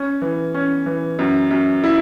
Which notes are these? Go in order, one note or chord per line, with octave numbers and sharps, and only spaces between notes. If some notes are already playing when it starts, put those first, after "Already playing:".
Already playing: C#4
E3
C#4
E3
F#2
F#2
E4